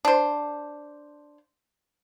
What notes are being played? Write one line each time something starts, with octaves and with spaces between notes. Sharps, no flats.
D4 C5